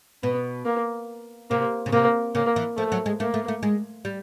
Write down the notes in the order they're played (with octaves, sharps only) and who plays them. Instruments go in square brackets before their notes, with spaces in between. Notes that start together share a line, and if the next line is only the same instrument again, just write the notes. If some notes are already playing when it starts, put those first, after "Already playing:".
[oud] B2 [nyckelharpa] B3
[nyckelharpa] A#3
[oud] C3 [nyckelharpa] A#3
[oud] C#3
[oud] C3 [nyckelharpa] A#3
[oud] C#3 [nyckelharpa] A#3
[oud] E3
[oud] F3 [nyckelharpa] A3
[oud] F#3
G#3
[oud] A3 [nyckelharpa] A#3
[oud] A3
A3
G#3
G3